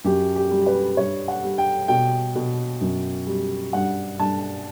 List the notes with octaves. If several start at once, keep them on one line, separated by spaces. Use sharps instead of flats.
F#2 G4
G4
G3
B4
G2 C#5
F#5
G3
G5
B2 G5
B2
F#2
G3
G2 F#5
G2 A5